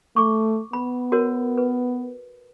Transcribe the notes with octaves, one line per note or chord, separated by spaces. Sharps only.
A3 C#6 D6
B3 B5
F#4 A#4 C#5
B4